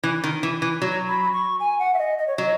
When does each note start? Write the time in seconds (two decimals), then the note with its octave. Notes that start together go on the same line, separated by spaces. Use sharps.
0.03 E3
0.24 D#3
0.43 E3
0.62 E3
0.82 F#3
1.08 B5
1.33 C#6
1.60 G#5
1.79 F#5
1.94 E5
1.99 D#5
2.18 D#5
2.27 C#5
2.37 F#3 D#5